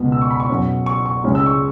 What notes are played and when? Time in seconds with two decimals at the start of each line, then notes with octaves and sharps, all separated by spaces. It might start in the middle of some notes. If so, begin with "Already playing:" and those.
Already playing: C#2 B2 B3
0.12 E6
0.22 C#6
0.31 B5
0.40 C#6
0.49 B2 F#3 C#4
0.86 C#6
1.06 C#6
1.24 C#2 C#3 G#3 C#4
1.35 E6
1.46 C#6